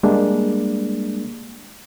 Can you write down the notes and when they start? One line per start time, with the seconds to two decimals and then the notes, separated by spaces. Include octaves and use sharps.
0.03 G3 G#3 A#3 D4